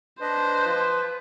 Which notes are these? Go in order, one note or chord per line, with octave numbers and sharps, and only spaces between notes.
D4 B4 C5 D#5
F3 F4